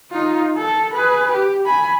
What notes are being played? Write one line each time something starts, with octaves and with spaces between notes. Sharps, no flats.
D#4 F4
A4
G#4 B4
G4
G#5 B5